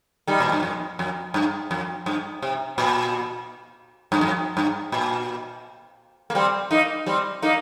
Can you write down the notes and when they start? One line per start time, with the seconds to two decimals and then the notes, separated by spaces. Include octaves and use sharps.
0.27 D#3 G3
0.40 A#2
0.52 G2
0.63 F2
0.99 F2
1.34 G2
1.71 F2
2.06 G2
2.42 C3
2.78 A#2
4.12 G2
4.21 F2
4.57 G2
4.92 A#2
6.30 A#3
6.35 G3 C4
6.71 A#3 D#4
7.06 G3 C4
7.42 A#3 D#4